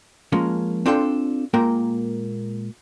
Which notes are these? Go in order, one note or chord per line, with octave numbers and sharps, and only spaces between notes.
F3 G#3 A#3 C#4
C4 D4 F4 A4 G5
A#2 G#3 A#3 A#4 G5